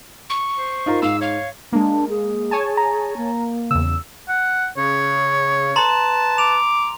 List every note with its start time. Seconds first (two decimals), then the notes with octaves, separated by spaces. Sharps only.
0.30 C#6
0.58 C5
0.86 D#4 F4 A#4
1.02 G#2 F5 E6
1.21 C#5 F5
1.73 G#3 A#3 D4
2.09 G#4
2.51 C#5 G#5 A5
2.77 A#5
3.17 A#3
3.71 E2 C#3 E6
4.28 F#5
4.77 C#3 C#5
5.76 B4 A5 A#5 C6
6.38 D6 F7